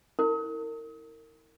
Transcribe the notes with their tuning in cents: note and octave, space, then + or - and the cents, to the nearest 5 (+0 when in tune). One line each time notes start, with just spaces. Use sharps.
E4 -35 A#4 -30